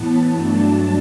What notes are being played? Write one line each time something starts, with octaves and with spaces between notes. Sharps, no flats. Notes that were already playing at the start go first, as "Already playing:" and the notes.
Already playing: A2 E3 B3 A5
G2 F#3 A3 D4